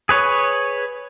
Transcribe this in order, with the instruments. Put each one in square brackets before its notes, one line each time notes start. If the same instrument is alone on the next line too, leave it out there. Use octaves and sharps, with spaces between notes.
[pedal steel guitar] G#4 B4 C#5